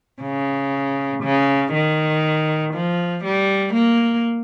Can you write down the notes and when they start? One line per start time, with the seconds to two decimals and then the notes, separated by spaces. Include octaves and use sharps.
0.23 C#3
1.23 C#3
1.73 D#3
2.74 F3
3.24 G3
3.74 A#3